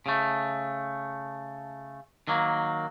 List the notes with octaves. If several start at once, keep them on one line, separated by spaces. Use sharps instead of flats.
C#3 A3
D#3 F#3 A#3